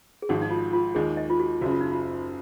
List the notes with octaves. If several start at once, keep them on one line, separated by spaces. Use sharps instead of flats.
G#4
G#1 G#2 F3 F#4
D#4
F4
F4
D#2 D#3 G#3 G#4
D#5
F4
F#4
F#1 F#2 C#3 F#4
F4
D#4
F4